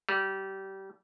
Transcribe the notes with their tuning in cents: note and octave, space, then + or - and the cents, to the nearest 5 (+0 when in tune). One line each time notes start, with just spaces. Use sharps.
G3 -25